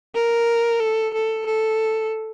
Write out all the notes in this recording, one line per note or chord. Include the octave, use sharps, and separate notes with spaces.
A#4
A4
A4
A4